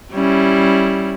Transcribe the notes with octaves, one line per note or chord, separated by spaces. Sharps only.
G3 C#4 E4